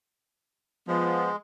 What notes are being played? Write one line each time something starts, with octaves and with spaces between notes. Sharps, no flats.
F3 G#3 B3